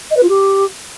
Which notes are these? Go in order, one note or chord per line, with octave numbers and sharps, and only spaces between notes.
D#5
B4
F4
G4